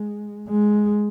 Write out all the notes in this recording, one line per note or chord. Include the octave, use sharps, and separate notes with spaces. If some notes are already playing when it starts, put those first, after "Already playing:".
Already playing: G#3
G#3